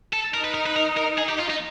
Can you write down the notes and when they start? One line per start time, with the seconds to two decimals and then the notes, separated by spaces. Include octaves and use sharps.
0.13 A4
0.34 D#4 A#4
0.44 B4
0.54 A#4
0.66 B4
0.76 A#4
0.97 A#4
1.18 G#4
1.29 G4
1.39 F4
1.50 D#4